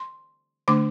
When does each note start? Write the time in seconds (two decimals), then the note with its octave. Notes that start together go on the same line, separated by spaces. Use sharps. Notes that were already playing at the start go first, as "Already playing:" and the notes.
Already playing: C6
0.68 D3 A3 D4 D6